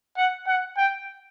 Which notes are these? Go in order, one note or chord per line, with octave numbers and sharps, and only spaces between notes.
F#5
F#5
G5